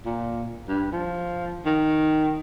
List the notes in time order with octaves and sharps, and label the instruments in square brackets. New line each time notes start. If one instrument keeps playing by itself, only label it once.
[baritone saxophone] A#2
G2
F3
D#3